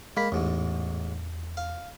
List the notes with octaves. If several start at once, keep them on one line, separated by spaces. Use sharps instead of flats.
G#3 A#3 B5 B6
A1 E2 G#2
F5